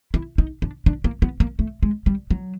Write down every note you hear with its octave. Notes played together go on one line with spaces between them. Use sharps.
E4
D#4
D4
D4
A#3
B3
A#3
A3
G#3
G3
F#3